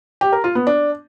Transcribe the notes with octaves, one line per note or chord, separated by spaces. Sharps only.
G4
A#4
F4
B3
D4